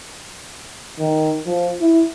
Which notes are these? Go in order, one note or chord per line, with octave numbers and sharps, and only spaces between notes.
D#3
F3
E4